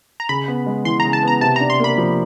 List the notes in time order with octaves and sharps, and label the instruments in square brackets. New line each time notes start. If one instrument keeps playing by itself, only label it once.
[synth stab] A#5
[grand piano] C#3 [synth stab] B5
[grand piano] B3
G#3
[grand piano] E3 [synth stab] C6
[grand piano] C#3 [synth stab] A#5
[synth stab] A5
[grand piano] B3 [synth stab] A#5
[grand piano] C3 [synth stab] A5
[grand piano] D4 [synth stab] A#5
[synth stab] C6
[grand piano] A#3 [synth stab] B5
[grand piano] F3